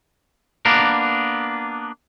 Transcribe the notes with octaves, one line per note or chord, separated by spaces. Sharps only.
A#3 B3 D4 A#4